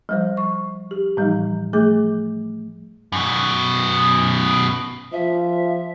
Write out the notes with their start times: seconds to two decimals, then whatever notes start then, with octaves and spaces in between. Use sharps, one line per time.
0.09 F3 G3 C5
0.37 C#6
0.91 G4
1.17 A2 E3 F3 G3 D#4
1.73 F3 A3 G#4 D6 G6
3.12 F#2 B2
5.12 F3 E5